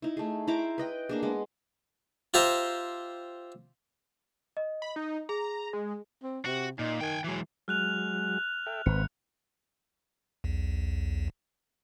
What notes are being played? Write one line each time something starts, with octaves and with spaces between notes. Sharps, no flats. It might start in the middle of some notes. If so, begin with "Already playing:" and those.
D#4 E4
A3 G#4
E4 C5 A#5 D6
B4 D#5 G5
A#3 D4 G#4
G#3 B3 D#5
F4 G4 C5 E5 A#5
D#5
B5
D#4
G#4 A#5
G#3
C4
C3 F#4
A#2 D#4
D#3 G5 G#5
E3 F#3 G#3
F#3 G#3 F6 F#6 F7
A4 E5 G5
G#1 C4 B4 C#7
B1 E2